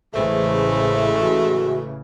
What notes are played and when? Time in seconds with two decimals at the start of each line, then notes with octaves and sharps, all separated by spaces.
0.14 A1 C#3 E3 G#3 A3 C5
1.20 F#4